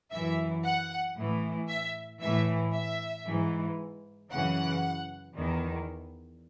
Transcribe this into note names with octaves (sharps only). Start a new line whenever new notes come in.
F#2 E3 E5
F#5
A2 E3
E5
A2 E3 E5
E5
G#2 E3
F#2 C#3 E3 F#5
E2 D#3